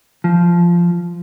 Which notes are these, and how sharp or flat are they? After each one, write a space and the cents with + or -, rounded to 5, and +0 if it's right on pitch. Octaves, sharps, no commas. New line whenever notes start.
F3 -10